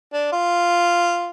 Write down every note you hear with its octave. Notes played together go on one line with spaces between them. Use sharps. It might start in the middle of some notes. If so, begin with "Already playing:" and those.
D4
F4